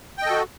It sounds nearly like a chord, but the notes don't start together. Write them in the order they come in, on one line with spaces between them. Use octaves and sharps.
G5 D#5 A4 F#4